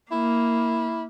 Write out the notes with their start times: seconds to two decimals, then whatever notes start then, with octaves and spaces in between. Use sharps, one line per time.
0.12 A#3 E4